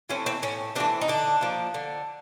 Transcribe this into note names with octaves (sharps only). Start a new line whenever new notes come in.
E3 A3 C4 C#4
C4
A2 C#4
E3 A3 C4 D4
D#4
D3 D4
F3 A#3
D3